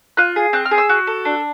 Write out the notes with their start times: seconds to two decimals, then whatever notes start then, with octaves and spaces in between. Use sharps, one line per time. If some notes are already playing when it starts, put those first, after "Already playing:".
0.17 F4 F#6
0.36 G#4
0.53 C4 F#6
0.65 F6
0.71 G#4
0.78 E6
0.89 F#4
1.07 A4
1.25 D4